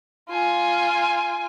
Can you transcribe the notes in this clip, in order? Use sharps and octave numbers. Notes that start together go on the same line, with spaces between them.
F4 G#5